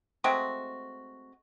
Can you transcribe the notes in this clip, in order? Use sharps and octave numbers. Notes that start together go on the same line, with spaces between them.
G#3 A3 C4 F#4